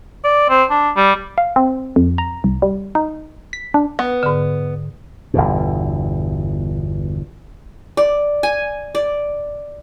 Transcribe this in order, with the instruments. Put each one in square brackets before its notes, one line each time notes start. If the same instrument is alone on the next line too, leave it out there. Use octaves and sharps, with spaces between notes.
[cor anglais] D5
C4
D4
G3
[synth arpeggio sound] F5
C4
F2
A#5
C2
G3
D#4
B6
D4
[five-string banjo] B3
[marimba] G#2 D3
[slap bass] G1 E2 B2
[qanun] D5
G#5
D5